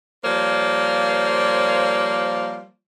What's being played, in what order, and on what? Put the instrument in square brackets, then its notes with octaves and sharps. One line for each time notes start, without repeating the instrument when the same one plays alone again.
[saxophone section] F3 G3 A#3 C5 C#5